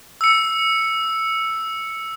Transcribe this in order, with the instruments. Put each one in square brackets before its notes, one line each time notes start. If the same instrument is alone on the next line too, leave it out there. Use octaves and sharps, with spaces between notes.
[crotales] E6 C#7